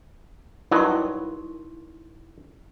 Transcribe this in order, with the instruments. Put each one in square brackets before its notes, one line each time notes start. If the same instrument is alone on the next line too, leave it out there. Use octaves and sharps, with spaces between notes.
[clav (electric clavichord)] G2 F#3 D#5 [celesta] D#4 C6 [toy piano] E4 A#4 C#6